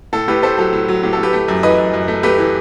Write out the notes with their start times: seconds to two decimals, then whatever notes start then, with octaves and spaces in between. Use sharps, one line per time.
0.13 A2 A4
0.28 A2 G4 B4
0.43 A3 A4 C5
0.58 F#3 A4
0.73 A2
0.88 F#3
1.03 A2 G4
1.13 A4
1.18 A2
1.23 G4 B4
1.33 A3
1.48 F#2
1.63 E3 B4 D#5
1.78 F#2
1.93 F#2
2.08 A3
2.23 A3 G4 B4
2.38 E3